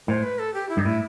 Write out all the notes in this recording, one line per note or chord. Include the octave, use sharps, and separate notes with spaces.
A2 C5
B4
A4
G4
E4
G2 D#4
A2 E4